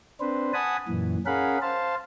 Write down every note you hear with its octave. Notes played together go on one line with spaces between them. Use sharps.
C4 D4 B4 C5
F#5 G#5 A5 B5 D#6
F#2 A#2 E3
C#4 G#4 A#4 F5 F#5 B5
C5 F5 A5